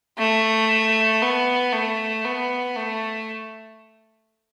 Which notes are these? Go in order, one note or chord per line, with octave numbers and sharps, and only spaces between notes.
A3
B3
A3
B3
A3